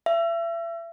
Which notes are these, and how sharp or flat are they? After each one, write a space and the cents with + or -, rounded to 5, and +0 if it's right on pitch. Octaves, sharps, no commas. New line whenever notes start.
E5 +35